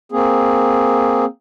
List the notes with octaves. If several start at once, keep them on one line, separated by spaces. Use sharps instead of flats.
A#3 C4 G#4